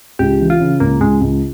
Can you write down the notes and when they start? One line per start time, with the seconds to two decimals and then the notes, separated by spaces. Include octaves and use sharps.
0.19 C#2 G4
0.40 E3
0.50 F4
0.60 C#3
0.80 C#2 A#3
1.01 C#2 G#3
1.21 C#2